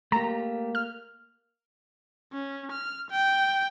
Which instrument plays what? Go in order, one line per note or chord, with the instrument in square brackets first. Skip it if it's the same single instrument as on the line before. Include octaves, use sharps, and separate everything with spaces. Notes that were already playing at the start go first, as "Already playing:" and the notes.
[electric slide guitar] A3 G4 [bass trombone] A#3 [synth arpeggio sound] A#5
[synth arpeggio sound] F6
[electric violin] C#4
F6
G5